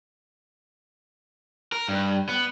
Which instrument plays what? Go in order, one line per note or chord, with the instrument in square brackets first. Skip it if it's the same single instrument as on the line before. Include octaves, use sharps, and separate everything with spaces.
[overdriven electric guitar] A#4
G2
B3